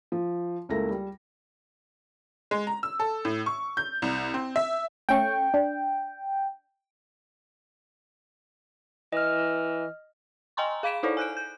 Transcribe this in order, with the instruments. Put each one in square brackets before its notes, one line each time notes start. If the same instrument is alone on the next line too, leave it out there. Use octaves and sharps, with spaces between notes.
[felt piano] F3
C#2 A3 A#3 E4 A#6
G3
[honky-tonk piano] G#3
A#5
E6
A4
A2
C#6
G6
C2
C4
E5
[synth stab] A3 C#4 C#6 [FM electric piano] G5
[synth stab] D4
[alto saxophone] E3 [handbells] D#5 F6
[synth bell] D#5 G5 G#5 A#5 C6 C#6
G#4 F5 B5 B6 D7 E7
D#4 E4 A4 C5 D5
G#5 F#6 G6 D7
G6